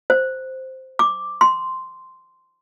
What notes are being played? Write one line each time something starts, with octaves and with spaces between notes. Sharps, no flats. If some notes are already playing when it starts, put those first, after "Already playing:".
C5
D6
C6